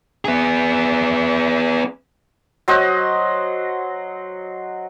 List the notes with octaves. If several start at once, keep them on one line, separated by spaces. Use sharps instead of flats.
B3 G#4
F#3 C5 D#5 F#5